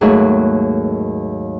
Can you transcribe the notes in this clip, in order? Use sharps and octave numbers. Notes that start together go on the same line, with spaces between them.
D#2 G#2 F#3 A3 A#3